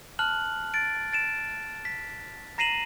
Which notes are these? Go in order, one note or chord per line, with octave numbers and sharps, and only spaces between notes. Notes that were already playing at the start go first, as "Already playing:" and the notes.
A5 F6 F#6 F#7
A6 D7
A6 D7 E7
B6
A#5 A#6 C7 D#7 E7 F#7